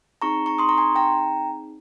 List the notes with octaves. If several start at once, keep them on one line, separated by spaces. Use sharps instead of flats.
C4 D#4 G#4 A#5 C#6
A#5 C#6
C6 D#6
A#5 C#6
G#5 C6
G5 A#5